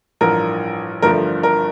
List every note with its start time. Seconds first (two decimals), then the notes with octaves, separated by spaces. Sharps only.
0.21 A1 G2 F3 A#4
1.02 G1 G2 F3 A3 A#4
1.43 A#4